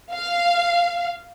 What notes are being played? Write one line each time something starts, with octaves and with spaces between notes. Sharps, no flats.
F5